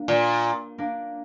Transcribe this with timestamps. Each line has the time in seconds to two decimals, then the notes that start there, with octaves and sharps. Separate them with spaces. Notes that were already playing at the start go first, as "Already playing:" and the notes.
Already playing: A#3 D4
0.08 A#2
0.78 A#3 D4